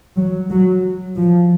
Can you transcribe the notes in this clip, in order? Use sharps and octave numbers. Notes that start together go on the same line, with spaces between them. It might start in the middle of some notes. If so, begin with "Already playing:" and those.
F#3
F#3
F3